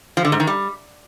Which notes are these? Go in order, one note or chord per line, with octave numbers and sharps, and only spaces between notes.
F3
D3
G#2
D#3
G3